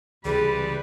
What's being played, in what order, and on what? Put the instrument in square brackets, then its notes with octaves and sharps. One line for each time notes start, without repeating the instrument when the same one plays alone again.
[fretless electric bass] C#2 E3 [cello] C3 B4 [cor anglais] G3 [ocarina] G#4